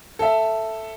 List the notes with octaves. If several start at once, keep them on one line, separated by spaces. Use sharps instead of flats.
A4 E5